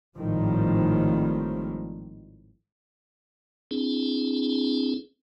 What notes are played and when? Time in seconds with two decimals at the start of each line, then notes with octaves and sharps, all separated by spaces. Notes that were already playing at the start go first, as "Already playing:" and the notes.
0.17 G#1 A2 D#3 F3 G3
3.71 C4 D4 E4 G#4